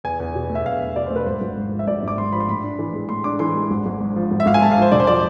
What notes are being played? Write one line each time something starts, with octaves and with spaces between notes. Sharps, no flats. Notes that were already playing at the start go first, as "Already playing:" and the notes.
E2 G#5
E2
B2
A3
E5
E2 F5
E2
B2 D5
C5
A3
B4
G#1 C5
G#1
G#2
F3
E5
G#1 D5
G#1 D6
G#2 C6
F3 B5
C6
A2 B5
D4
E3
G#3
A2 C6
D4 D6
E3 C6
G#3
G#1
G#1
G#2
F3
G#1
E5
G#1 F5
G#5
G#2 A5
F5
F3 C5
E1 D5
C5
F3 D5